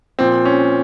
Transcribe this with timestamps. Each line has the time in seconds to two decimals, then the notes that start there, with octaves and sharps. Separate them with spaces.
0.19 A#2 F3 C4
0.45 C#4